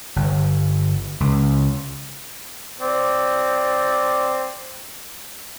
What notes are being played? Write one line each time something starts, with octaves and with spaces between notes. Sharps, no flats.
G1
C#2
C4 D5